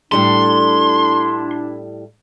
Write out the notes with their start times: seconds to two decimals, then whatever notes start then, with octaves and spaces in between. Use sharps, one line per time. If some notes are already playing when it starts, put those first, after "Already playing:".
0.12 A2 G3 D4 E4 A4 C6